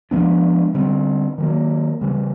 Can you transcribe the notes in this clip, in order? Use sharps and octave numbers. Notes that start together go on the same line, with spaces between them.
F3 G#3 B3 D4
D3 G3 C4
D#3 F#3 A#3
C#3 E3 G3